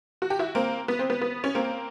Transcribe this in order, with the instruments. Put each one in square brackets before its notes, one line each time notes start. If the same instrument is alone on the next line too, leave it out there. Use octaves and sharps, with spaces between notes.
[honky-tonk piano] F#4
G4
E4 F#4
A#3 C4
B3
C4
B3
B3
C#4
A#3 C4